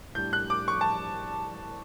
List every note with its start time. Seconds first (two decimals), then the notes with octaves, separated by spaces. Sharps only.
0.15 A2 G3 D4 G6
0.33 F#6
0.50 D6
0.68 C#6
0.81 A5